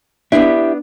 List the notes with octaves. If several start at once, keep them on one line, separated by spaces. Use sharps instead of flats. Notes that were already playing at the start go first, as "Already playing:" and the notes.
B3 D4 E4 G4 E5